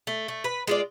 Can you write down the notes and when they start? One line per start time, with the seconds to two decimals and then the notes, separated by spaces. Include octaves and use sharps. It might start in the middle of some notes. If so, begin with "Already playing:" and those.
0.07 A3
0.28 A3
0.44 B4
0.67 G#3 F4 D5